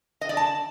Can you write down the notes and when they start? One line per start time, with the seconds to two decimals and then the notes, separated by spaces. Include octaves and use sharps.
0.21 D#5
0.29 D5
0.37 A5